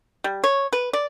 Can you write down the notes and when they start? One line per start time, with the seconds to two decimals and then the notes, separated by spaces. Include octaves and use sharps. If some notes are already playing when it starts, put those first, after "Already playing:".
0.24 G3
0.44 C#5
0.73 B4
0.93 D5